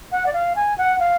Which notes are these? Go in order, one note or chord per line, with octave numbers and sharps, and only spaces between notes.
F#5
D5
F5
G#5
F#5
F5